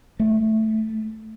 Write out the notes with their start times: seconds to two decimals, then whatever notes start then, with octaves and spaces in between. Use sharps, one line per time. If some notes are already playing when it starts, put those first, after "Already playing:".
0.20 A3